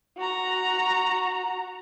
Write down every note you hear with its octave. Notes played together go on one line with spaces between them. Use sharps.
F#4 A#5